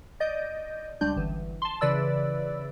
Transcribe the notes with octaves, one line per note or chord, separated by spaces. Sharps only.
D5 D#5 G6
C#2 G3 D4 G6
G1 E3
A5 C6
C#3 E3 B4 D5 B5 E6